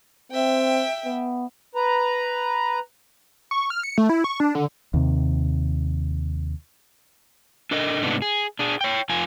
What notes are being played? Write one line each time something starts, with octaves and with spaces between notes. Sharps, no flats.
C4 E5 G5
B3
B4 A#5
C#6
F6
C#7
A3
E4
C#6
D4
D3
D#2 C3
D4 A4 A#4 D#5
G#2 C3 A3 B3 D4 D#4
G#4
D4 G#4
C#5 G5
F2 F4 G#5